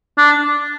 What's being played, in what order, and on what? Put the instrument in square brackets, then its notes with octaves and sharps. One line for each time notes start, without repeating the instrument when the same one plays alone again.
[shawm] D4